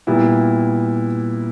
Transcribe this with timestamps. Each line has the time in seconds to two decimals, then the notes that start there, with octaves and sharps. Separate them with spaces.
0.07 A#2 G3 B3 E4